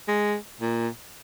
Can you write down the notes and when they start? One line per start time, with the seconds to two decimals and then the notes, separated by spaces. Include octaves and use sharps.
0.08 G#3
0.60 A#2